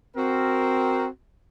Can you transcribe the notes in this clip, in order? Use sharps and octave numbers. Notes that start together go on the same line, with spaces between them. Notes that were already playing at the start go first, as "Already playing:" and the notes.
C4 F#4 A#4